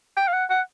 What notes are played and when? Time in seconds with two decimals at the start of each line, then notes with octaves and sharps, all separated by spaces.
0.17 G5
0.28 F5
0.33 F#5
0.50 F#5